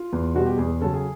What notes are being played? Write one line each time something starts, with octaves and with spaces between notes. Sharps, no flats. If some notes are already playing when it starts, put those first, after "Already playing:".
Already playing: F4
E2
B2 G3 F#4
G4
E2 G#4
C#3 F#3 A4
G#4